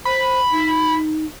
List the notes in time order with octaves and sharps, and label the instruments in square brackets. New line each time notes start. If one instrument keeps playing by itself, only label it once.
[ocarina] C5 [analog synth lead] B5
[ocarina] D#4